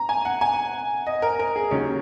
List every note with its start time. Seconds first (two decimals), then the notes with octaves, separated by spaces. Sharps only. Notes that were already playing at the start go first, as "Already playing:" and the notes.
Already playing: A#5
0.09 G#5
0.25 F#5
0.41 G#5
1.07 D#5
1.22 A#4
1.39 A#4
1.56 G#4
1.71 D#2 D#3 F#3 C#4